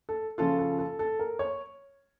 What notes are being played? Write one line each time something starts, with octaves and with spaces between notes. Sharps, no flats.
A4
C#3 F3 C#4 F4 A4
A4
A4
A4
A#4
C#5